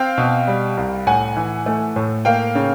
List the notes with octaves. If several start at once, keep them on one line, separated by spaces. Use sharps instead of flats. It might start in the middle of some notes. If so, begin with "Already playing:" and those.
Already playing: C4 F5 G5
B2
G3
C2
A2 F#5 G#5
E3
A3
A2
A#3 F5 G5
C#3